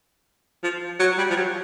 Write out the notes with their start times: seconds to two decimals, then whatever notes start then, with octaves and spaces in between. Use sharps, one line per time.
0.64 F3
1.00 F#3
1.18 G3
1.30 F3
1.36 F#3